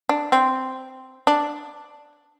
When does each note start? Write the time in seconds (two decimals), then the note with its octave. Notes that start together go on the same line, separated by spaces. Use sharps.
0.09 D4
0.32 C4
1.27 D4